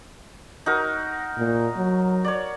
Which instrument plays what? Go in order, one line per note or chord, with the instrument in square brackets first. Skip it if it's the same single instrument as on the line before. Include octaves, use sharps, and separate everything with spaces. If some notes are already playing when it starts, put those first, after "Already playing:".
[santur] D#4 F#4 A#4
[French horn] A#2
F#3
[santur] C#5 D5